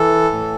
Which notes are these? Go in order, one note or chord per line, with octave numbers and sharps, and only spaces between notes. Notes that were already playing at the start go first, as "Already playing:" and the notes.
Already playing: E3 A4
A2